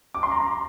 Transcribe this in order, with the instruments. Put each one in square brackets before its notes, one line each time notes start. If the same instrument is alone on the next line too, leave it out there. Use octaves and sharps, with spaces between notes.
[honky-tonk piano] D6
C6
A#5